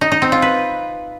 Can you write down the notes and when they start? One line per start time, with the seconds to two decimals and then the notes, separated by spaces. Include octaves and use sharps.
0.01 D#4
0.12 D#4
0.22 C4
0.32 F4
0.42 B4